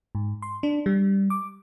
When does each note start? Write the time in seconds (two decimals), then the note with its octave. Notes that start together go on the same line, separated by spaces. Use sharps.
0.15 G#2
0.42 C6
0.63 D4
0.86 G3
1.30 D6